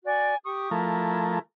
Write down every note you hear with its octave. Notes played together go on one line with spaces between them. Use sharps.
F#4 D5 G#5
G4 C#6 D#6
F3 A3 E4 A#4